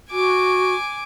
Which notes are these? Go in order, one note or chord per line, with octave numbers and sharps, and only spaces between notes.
F#4 G#5 D6